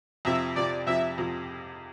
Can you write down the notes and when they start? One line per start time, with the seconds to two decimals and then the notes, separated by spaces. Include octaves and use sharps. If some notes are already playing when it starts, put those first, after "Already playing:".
0.25 F2 C3 F3 E5
0.55 F2 C3 F3 D5
0.87 F2 C3 F3 E5
1.18 F2 C3 F3